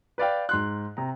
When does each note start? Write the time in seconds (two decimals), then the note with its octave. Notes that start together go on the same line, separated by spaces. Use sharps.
0.18 B4 D5 F5 G5
0.49 G#2 C6 F#6
0.97 C3 A#5